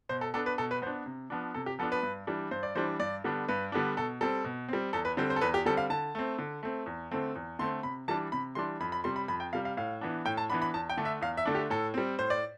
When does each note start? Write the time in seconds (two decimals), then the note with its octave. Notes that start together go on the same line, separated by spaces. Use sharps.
0.09 B2 C5
0.21 A4
0.34 B3 D4 A4
0.46 B4
0.58 B2 A4
0.71 B4
0.82 B3 C5
0.87 D4
1.06 C3
1.30 F3 B3 D4
1.54 C3 A4
1.66 G4
1.79 F3 B3 D4 A4
1.92 B4
2.03 G2
2.27 E3 G3 D4
2.51 G2 C5
2.63 D5
2.75 E3 G3 D4 C5
2.99 G2 D5
3.24 D3 G3 B3 D4
3.48 G2 B4
3.72 D3 G3 B3 D4
3.97 B2 A4
4.21 G3 C4 A4
4.44 B2
4.69 G3 C4
4.93 E2 A4
5.05 B4
5.17 D3 G3 C4 C5
5.30 C5
5.36 A4
5.41 E2 B4
5.54 G4
5.65 D3 G3 C4 A4
5.77 F5
5.90 D3 A5
6.15 A3 C4
6.38 D3
6.63 A3 C4
6.86 E2
7.12 D3 A3 C4
7.35 E2
7.59 D3 A3 C4 C6
7.83 C3 B5
8.08 E3 G3 D4 A5
8.32 C3 B5
8.55 E3 G3 D4 C6
8.80 F2 B5
8.92 B5
9.04 C3 G3 C6
9.16 B5
9.28 F2 B5
9.40 G5
9.53 C3 G3 F5
9.65 F5
9.77 A2 F5
10.01 E3 B3 D4
10.25 A2 G5
10.37 A5
10.50 E3 B3 D4 B5
10.62 B5
10.74 E2 A5
10.90 G5
10.97 D3 A3 D4
11.05 E5
11.21 E2 F5
11.37 E5
11.46 D3 A3 D4
11.55 G4
11.70 A2 A4
11.94 G3 C4
12.19 A2 C5
12.30 D5